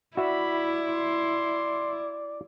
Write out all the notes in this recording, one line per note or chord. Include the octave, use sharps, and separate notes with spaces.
E4 F#4 D5 E5 B5
C6